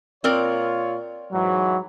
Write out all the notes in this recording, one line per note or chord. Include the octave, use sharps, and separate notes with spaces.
A#2 C4 F4 A#4 C#5 D5
G#2 E3 F#3